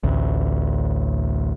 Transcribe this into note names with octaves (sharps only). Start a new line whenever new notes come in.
A1 D2